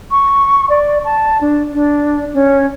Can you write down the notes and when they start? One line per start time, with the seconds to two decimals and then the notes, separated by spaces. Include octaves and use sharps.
0.11 C#6
0.70 D5
1.05 A5
1.41 D4
1.73 D4
2.34 C#4